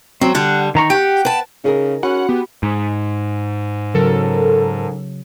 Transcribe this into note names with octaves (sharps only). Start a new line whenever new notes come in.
F#3 C4
D3 G3 F#5
D#3 A#5 C#6
G4 F#5 G5
B4 A5
C#3 D#4 G#4 A#4
C#4 F#4 F#5 B5
B3 G4
G#2
C#3 F#3 A4 A#4